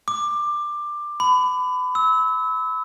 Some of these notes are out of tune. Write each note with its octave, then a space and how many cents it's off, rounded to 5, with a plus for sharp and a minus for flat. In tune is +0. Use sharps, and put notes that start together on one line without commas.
D6 +15
B5 +30
E6 -30